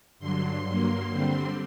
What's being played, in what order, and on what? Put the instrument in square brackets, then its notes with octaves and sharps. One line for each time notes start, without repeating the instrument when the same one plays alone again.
[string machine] G2 D3 F#3 C6
G2 F#3 A#3
D3 G3 C4